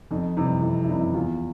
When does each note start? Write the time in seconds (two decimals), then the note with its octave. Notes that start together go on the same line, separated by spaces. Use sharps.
0.11 F2 D#4
0.37 C3 E3 G3 D#4
0.62 F2 E4
0.85 E4
0.88 C3 E3 G3 D#4
1.01 E4
1.14 E2 F4